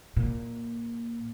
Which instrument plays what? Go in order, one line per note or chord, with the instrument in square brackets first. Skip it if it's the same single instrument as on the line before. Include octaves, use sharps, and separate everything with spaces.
[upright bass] A#2